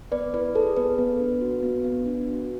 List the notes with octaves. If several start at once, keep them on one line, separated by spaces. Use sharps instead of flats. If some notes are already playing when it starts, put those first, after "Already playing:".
B3 B4 D5
E4 B4
G#4 A4
B3 B4
B3
D4
F#4
B3
B3
D4
F#4